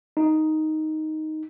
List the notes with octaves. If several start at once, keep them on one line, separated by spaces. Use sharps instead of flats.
D#4